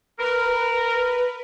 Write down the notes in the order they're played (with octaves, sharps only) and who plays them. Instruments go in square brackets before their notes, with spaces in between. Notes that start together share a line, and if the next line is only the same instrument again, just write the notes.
[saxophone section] A#4 [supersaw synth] B4